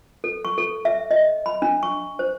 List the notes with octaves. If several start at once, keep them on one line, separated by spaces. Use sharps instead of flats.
A4
C#6
A4
E5
D#5
B5
D4
C#6
C5